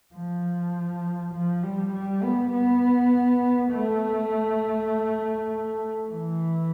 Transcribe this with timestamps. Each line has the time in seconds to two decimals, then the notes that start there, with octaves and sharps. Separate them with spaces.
0.14 F3
1.34 F3
1.63 G3
1.93 G3
2.23 B3
2.53 B3
3.72 A3
6.09 E3